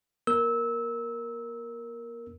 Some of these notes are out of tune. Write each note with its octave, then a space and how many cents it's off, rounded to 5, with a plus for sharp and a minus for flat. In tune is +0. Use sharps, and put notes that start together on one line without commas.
A#3 +40 A#4 +0 E6 -20